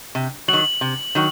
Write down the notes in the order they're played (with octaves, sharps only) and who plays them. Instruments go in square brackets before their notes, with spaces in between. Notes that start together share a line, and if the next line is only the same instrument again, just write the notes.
[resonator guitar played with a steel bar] C3
[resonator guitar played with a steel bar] D#3 F#3 [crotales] F#7
[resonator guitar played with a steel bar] C3
D#3 F#3